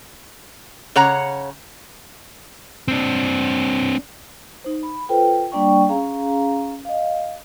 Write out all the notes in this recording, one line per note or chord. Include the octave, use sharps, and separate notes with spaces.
C#3 C#5 F#5 A#5
C4 D4
D#4 C5
B5
F4 A4 B4 C5 G5
G3 A#3 D4 D5 G5 C#6
C#4 G#4 F5 A#5
D#5 F5